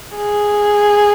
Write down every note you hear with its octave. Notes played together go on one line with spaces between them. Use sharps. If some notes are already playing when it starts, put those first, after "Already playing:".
G#4